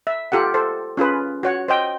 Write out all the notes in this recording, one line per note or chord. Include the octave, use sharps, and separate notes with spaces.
E5
F4 G4 A4 F#5
A4 C5
C#4 F4 G#4 B4
F#4 C#5 F#5
C5 D#5 G5